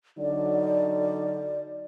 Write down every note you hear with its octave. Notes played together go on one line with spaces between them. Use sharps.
D3 F#3 D#4 D5